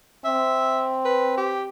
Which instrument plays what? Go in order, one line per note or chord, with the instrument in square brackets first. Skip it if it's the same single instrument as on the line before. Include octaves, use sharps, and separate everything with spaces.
[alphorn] C4 [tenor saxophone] E5
[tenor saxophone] B4
G4